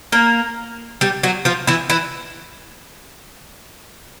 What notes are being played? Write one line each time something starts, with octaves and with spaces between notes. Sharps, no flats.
A#3 A#4
G3 G4
F#3 F#4
F3 F4
E3 E4
E3 E4